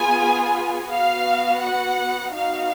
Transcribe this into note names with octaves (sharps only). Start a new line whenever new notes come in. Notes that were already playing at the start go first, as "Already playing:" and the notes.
Already playing: B3 F4 G#4 G#5
B3 F#4 F5
F#5
B3 D#4 F#4 F5